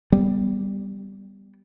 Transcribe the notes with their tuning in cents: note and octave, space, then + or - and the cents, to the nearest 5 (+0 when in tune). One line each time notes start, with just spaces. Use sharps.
G3 +0 B3 +0